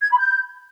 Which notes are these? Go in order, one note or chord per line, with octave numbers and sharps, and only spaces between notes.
G#6
B5
G6